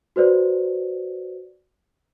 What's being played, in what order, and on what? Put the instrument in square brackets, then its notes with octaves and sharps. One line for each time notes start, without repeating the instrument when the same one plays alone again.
[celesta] F#4 B4 C5 D5